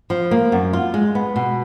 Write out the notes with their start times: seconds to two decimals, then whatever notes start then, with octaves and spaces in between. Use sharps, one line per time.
0.10 F3
0.31 A#3
0.52 F#2
0.73 F4
0.94 G#3
1.15 B3
1.36 B2